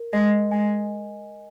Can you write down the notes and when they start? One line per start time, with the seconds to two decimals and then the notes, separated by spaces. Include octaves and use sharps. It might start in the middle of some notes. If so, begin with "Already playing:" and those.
Already playing: A#4
0.13 G#3 D#5
0.51 G#3 G#5